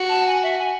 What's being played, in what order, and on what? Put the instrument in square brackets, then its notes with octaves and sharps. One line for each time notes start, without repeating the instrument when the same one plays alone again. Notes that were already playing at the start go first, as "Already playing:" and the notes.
Already playing: [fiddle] F#4
[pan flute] A5
G#5
E5
G#5